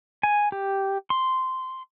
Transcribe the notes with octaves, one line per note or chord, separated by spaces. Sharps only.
G#5
G4
C6